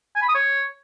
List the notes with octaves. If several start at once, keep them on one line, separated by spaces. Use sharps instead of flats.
G#5
B5
D#6
C#5